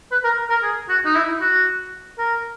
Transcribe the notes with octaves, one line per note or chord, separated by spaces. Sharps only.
B4
A#4
A#4
G#4
F#4
D#4
E4
F#4
A#4